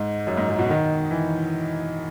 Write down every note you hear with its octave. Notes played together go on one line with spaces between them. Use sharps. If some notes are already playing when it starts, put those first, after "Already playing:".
Already playing: G#2
F#2
G#2
F#2
B2
D#3
E3